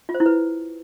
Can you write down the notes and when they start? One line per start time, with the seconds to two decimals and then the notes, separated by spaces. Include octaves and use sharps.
0.09 F4
0.15 C5
0.20 E4
0.26 B4